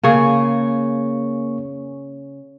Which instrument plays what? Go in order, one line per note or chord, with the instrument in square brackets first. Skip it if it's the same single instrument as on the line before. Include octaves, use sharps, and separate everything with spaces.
[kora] C#3 G#4 [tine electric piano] A#3 C#6